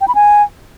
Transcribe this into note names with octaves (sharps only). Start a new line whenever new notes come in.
G5
B5
G#5